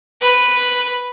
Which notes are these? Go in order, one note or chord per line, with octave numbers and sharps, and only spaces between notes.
B4